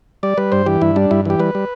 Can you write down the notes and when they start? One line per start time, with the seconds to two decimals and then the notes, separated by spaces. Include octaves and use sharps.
0.23 G3 D5
0.38 G3 B4
0.52 G2 C5
0.66 E3 G4
0.81 G2 E4
0.96 G3 D4
1.11 G2 E4
1.25 E3 G4
1.39 G3 B4
1.55 G3